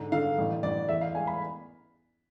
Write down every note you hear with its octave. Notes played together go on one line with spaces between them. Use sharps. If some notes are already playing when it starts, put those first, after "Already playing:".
Already playing: G#2 D3
D3 F5
A1
A1 D5
E2 E5
F5
G#3 G#5
B5